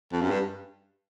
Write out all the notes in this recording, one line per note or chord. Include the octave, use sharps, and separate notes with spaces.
F2
F#2
G2